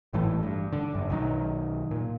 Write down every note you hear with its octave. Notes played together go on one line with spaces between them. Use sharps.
G#1 A2 E3 A3
G2
D3
G1 F#2
B1 D#3 F#3
A#2